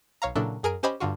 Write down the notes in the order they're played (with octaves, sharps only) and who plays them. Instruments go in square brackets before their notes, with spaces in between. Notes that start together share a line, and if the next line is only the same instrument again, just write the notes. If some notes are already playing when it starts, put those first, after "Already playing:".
[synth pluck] B1 C#5 F5 A#5
A#2 C#3 F#3 D4 E4 A4
F#2 G#4 A#4 G#5 D7
C#4 G4 C5 D#5 G#5 B5
G2 D3 F4 F#4